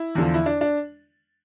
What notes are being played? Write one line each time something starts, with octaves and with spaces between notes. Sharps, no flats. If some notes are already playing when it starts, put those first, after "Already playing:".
Already playing: E4
E2 D3 F3
E4
D4
D4